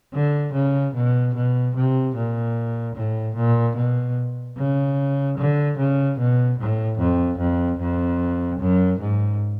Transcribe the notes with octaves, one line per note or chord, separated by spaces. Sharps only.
D3
C#3
B2
B2
C3
A#2
A2
A#2
B2
C#3
D3
C#3
B2
A2
F2
F2
F2
F#2
G#2